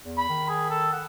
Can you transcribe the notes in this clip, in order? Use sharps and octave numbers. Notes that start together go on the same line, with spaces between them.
E2
B5
D#3
G#4
A4
F#5